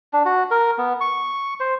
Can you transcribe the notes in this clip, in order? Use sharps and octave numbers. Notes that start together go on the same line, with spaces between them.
D4
F#4
A#4
B3
C#6
C5